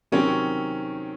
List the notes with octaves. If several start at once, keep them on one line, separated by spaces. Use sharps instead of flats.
C3 D#3 F#3 C4 C#4 C#5